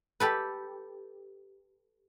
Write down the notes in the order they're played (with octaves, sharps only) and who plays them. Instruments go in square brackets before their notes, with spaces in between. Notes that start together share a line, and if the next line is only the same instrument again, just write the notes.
[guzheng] G4 A4 B4